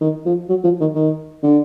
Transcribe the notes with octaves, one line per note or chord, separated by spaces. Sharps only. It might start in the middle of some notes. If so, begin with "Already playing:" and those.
D#3
F3
F#3
F3
D#3
D#3
D3